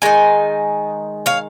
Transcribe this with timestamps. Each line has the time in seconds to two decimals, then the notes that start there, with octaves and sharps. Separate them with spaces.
0.02 D#3 G#3 D#4 D#5 G#5
1.26 C#5 F5